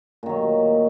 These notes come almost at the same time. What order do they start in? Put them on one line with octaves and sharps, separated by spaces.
A#2 D#3 F#3